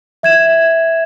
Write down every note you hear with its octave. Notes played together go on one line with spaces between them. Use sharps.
E5 G#6 E7